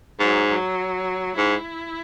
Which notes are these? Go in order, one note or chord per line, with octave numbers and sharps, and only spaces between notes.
G#2 F#3
F#3
G#2 E4